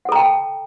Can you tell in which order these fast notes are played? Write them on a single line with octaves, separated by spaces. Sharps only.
F#5 A4 A#5 G5 A5